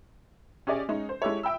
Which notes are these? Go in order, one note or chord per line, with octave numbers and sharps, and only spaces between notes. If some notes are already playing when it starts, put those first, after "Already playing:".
C#4 G4 G#4 D5 D#5 G#5
G#3 C#4 D#4
C5
G#3 E4 G4 A4 C#5
E5 G5 B5 E6